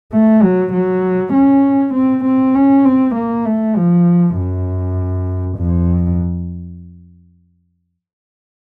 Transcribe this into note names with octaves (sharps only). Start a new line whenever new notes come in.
A3
F#3
F#3
C#4
C4
C4
C#4
C4
A#3
A3
F3
F#2
F2